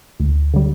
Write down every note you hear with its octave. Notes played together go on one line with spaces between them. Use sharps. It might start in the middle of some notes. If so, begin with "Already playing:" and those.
D2
D3 G3